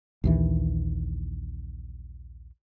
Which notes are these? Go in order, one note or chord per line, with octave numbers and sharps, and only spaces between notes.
A#1 D#2 E3